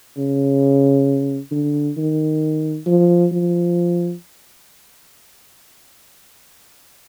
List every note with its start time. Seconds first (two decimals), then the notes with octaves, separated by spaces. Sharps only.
0.17 C#3
1.51 D3
1.97 D#3
2.87 F3
3.32 F3